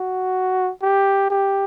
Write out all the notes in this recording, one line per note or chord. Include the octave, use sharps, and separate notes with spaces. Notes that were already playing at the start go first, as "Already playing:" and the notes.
Already playing: F#4
G4
G4